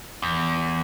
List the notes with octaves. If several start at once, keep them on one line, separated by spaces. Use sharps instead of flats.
E2